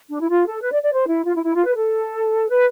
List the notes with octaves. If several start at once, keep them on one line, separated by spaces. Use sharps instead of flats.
D4
E4
F4
A4
B4
D5
D5
C5
E4
F4
E4
E4
F4
B4
A4
B4